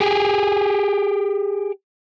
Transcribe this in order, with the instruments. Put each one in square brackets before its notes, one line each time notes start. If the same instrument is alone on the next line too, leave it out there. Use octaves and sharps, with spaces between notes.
[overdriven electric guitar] G4 G#4